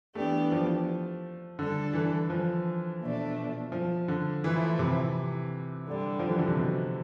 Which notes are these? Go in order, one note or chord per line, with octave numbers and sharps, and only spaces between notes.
E3 A3 B3 D4 G4
F3
D3 G3 D4 A4
E3
F3
B2 A3 D4
F3
D3
A2 E3 F3 A3 E4
C3
G2 D3 G3
F3
E3
D3
C3
B2